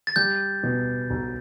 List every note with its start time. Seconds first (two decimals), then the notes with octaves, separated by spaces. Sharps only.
0.07 A6
0.16 G3 G6
0.63 B2
1.10 B1